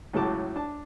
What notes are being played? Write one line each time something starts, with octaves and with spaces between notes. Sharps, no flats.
C#2 A2 C#3 F#3 A5 D6
D4 A5